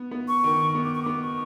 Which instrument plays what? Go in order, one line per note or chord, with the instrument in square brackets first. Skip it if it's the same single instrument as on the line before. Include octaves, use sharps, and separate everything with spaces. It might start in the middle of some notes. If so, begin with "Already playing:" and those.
Already playing: [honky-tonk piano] B3
B3
[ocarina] C#6
[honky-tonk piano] D#3
B3
[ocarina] D6
C#6
[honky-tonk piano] B3 [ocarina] D6
[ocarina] C#6